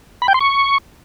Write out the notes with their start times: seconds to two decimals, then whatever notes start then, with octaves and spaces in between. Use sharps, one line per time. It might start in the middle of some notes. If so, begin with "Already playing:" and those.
0.22 B5
0.28 G5
0.34 C6
0.41 C#6